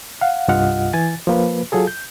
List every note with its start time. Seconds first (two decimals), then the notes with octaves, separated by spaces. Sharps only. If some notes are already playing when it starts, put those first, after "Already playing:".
0.21 F5 F#5
0.48 C2 G2 F4 D#5 F#5 F6
0.93 E3 G#5 A6
1.27 F3 A#3 B4
1.72 F#3 F4 G#4 A4
1.87 G6